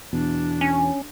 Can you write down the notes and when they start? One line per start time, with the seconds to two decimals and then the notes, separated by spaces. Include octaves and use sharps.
0.13 E2 B2 D4
0.61 C#4